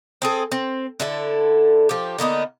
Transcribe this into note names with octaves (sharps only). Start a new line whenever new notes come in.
C4 G#4 A4
C4
D3 E4 A4
F3 G4
D3 A#3 B3 D#4